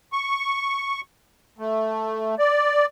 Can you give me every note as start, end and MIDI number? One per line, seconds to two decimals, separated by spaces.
0.13 1.01 85
1.58 2.35 57
2.39 2.86 74